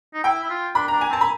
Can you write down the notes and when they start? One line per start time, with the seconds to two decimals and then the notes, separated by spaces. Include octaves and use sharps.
0.14 D#4
0.24 E4 G5
0.43 E4
0.50 F4
0.75 D4 B5
0.88 D4 A#5
1.01 G#5
1.10 C4 A5
1.21 B5